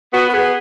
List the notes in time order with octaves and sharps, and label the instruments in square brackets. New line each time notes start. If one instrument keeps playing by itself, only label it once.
[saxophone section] B3 [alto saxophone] F#4
[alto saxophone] B4
[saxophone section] B3 [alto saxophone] G#4